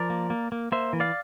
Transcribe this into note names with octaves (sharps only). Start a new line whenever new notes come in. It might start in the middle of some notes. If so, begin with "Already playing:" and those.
Already playing: F3 A#4 D5
A#3
A#3
A#3
A#3 C5 E5
E3
D5 F5